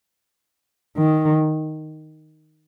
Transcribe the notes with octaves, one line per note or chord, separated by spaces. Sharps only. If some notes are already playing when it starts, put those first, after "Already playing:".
D#3